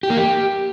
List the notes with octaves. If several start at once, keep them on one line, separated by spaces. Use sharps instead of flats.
G4
A#3
G4